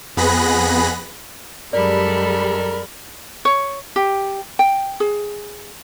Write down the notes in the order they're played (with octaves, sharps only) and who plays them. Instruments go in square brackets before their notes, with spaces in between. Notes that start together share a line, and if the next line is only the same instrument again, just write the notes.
[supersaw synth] F2 B3 G#4 B5 F#6 A#6
[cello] F#2 A4 [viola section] G3 G#3 B5 [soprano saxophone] A#4 [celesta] D5
[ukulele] C#5
G4
G5
G#4